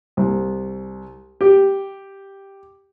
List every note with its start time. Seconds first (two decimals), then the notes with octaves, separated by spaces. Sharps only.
0.17 C2
1.41 G4